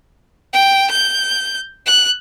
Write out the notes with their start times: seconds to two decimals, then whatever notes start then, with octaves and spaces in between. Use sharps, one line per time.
0.53 G5
0.91 G6
1.86 F#6